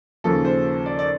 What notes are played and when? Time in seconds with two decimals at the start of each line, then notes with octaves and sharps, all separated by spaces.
0.24 D#2 C#3 F3 A#3 A4
0.45 C5
0.86 D5
0.99 D5